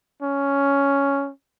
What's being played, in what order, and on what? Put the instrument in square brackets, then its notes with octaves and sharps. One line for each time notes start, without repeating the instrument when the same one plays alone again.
[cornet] C#4